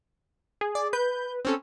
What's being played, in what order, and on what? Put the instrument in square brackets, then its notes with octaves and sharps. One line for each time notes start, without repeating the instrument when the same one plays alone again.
[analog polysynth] G#4
[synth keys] D5
[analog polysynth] B4 [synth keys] G6
[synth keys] C4 C#4 A4